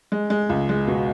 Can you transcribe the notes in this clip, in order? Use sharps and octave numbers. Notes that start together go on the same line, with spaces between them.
G#3
G#3
C#2
G#3
B2